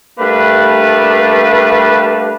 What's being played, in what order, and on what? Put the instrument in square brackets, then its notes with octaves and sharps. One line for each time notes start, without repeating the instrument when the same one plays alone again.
[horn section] G3 A3 A#3 D4 B4